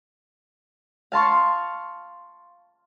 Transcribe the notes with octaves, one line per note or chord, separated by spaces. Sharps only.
F5 A5 C6 C#6